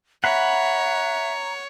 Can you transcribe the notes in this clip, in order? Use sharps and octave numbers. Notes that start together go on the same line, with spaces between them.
C#5 E5 F#5 A#5 B5